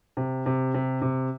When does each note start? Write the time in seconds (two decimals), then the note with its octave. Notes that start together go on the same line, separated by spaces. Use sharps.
0.17 C3
0.46 C3
0.74 C3
1.02 C3